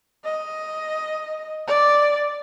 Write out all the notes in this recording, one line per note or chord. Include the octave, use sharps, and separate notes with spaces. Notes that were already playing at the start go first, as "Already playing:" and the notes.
D#5
D5